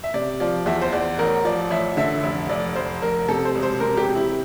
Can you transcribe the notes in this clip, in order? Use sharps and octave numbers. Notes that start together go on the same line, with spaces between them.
E5
C3 D5
F3 D5
E2 E5
C5
E2 D5
A1 A#4
F3 D5
A1 E5
D3 E5
F1 E5
F1 D5
F1 C5
F1 A#4
C3 A4
C5
E1
C5
C3 A#4
G4
C3
E4